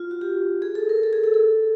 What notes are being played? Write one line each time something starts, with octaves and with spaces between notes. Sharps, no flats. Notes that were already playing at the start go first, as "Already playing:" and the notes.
Already playing: F4
F#4
G4
G#4
A4
A#4
A4
G#4
A4
A4